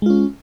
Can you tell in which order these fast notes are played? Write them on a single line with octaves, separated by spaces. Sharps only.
G#3 F4 C#4